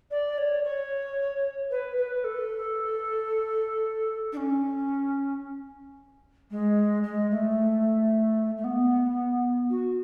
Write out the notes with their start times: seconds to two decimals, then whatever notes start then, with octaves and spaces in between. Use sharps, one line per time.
0.11 D5
0.38 C#5
0.64 C#5
1.71 B4
1.97 B4
2.24 A4
4.33 D4
4.37 C#4
6.51 G#3
7.03 G#3
7.31 A3
8.57 A3
8.64 B3
9.70 F#4